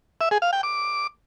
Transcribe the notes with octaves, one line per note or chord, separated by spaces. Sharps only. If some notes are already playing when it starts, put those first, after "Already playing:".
E5
G#4
F5
G5
D6